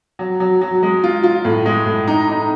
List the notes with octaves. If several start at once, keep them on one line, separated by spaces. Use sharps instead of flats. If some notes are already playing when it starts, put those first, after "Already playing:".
F#3
F#3
F#3
G#3
F4
F4
A2
G#3
A2
D#4
D#4